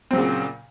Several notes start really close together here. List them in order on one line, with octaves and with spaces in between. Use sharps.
C4 F#3 C#3 A#2